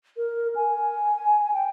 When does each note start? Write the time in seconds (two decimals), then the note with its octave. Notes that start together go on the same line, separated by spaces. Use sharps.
0.17 A#4
0.56 G#5
1.54 G5